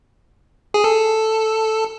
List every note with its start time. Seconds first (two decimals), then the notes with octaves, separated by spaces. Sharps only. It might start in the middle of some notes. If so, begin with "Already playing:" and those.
0.74 G#4
0.84 A4